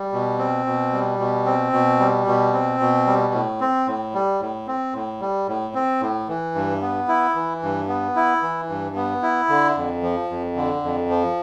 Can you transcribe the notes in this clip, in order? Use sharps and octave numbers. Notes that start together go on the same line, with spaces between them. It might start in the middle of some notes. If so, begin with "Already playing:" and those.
Already playing: G3
B2
C4
B2
G3
B2
C4
B2
G3
B2
C4
B2
G3
A2
C4
A2
G3
A2
C4
A2
G3
A2
C4
A2
E3
G2
B3
E4
E3
G2
B3
E4
E3
G2
B3
E4
D3
F2
F3
F2
D3
F2
F3